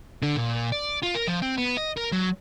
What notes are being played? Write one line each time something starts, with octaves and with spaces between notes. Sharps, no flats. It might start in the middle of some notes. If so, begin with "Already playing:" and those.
D3
A#2
D5
F4
A#4
F3
C4
B3
D#5
A#4
F#3